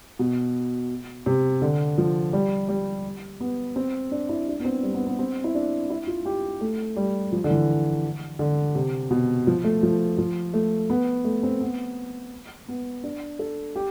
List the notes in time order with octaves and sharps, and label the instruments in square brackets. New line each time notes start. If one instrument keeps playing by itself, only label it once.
[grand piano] B2
C3
D3
F3
G3
G3
B3
C4
D4
E4
D4
B3
C4
G3
B3
B3
C4
E4
D4
E4
F4
G4
A3
G3
F3
D3
E3
D3
C3
B2
F3
A3
F3
F3
A3
B3
A3
C4
B3
B3
D4
A4
G4